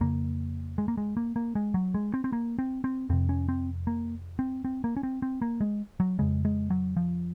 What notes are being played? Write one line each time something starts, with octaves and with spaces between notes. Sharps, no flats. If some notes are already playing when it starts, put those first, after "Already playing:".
F2 C#3 A#3
G#3
A#3
G#3
A#3
A#3
G#3
F#3
G#3
C4
C4
A#3
C4
C4
F2 C3 C4
C#4
C4
A#3
C4
C4
A#3
C#4
C4
C4
A#3
G#3
F#3
F2 C#3 G#3
G#3
F#3
F3